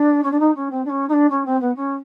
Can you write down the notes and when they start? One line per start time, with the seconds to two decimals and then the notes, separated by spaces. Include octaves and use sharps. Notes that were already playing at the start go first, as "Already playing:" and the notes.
Already playing: D4
0.23 C#4
0.31 D4
0.39 D#4
0.55 C#4
0.70 C4
0.84 D4
0.89 C#4
1.08 D#4
1.12 D4
1.29 C#4
1.45 C4
1.60 B3
1.75 C#4